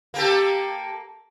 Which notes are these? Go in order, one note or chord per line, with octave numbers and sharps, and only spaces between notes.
A#3 G4 A4